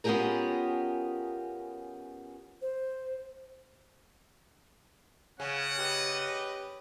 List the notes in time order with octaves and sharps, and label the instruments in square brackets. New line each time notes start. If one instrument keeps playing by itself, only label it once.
[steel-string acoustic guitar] B3 C#4 F4 G4 G#4 A#4
[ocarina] C5
[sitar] C#3 [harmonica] C#4 [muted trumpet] F#5
[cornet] G4 [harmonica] B4 D#5